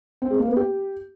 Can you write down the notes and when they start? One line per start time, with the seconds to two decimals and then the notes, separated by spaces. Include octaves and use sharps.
0.22 C4
0.30 G#3
0.39 A#3
0.48 B3
0.56 G4